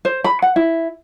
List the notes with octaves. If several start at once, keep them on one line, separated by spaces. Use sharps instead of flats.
C5
B5
F#5
E4